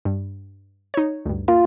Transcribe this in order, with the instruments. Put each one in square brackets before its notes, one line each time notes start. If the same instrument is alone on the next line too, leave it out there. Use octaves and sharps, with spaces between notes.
[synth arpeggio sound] G2
D#4 C#5
D2 G2
[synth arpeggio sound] A#3 [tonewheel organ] F4